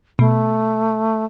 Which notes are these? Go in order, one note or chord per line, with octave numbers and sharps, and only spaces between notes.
B2 A3